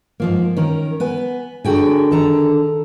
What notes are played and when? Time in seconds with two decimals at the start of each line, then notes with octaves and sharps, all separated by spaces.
0.20 G#2 F3 A#3
0.57 D#3 C#4 A#4
1.00 B3 B4 G#5
1.64 D3 F#4 G#4 A#4 G5 G#5
2.11 D#3 A4 A#5